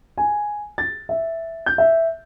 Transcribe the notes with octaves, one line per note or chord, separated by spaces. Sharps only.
G#5
A6
E5
G6
E5